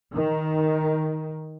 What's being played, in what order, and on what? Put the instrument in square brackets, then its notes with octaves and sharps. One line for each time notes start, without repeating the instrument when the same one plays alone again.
[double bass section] D#3